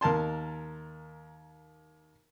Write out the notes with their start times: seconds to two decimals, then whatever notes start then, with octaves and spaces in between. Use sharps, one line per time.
0.01 D#2 A#4 A5 C6